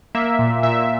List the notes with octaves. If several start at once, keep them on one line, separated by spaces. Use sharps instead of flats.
A#3 E5
A#2
A#2 E5